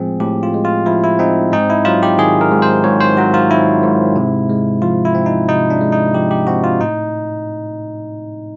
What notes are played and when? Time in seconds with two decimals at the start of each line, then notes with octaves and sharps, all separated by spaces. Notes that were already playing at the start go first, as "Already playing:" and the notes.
Already playing: A2 F3 G#3 C4 G#4
0.20 A2 G4
0.43 F4
0.54 G#3
0.65 F4
0.86 F3 E4
1.04 E4
1.19 C4 D#4
1.52 G#2 D#4
1.70 E4
1.85 F#3 F4
2.03 G4
2.18 D#3 G#4
2.41 A#4
2.51 G#2
2.62 C5
2.84 G#2 C#5
3.00 C5
3.17 F#3 F#4
3.34 F4
3.50 D#3 E4
3.83 G#2
4.16 C3
4.50 G#3
4.82 F3 F4
5.05 E4
5.15 C4
5.26 D#4
5.49 C3 D#4
5.70 D4
5.81 G#3
5.92 D#4
6.14 F3 G4
6.31 G4
6.47 C4 F#4
6.64 F4
6.81 A2 D#4